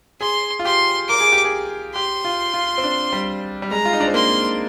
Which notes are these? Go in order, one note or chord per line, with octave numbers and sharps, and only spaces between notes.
G#4 C6
F4
G4 C6
A#4 D6
G#4
G4
G#4
G4 C6
F4
F4
C4
D4
G3
G3
G#3 A#5
F4
D#4
D4
C4
A#3 C6